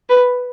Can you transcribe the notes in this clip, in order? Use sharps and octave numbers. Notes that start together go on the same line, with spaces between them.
B4